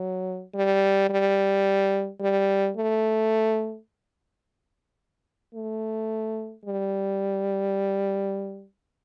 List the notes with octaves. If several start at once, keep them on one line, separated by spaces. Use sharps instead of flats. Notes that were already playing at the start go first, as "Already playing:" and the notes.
Already playing: F#3
G3
G3
G3
A3
A3
G3